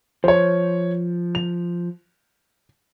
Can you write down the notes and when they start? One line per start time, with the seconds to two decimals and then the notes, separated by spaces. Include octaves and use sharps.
0.24 F3 C5 C#5
1.35 F7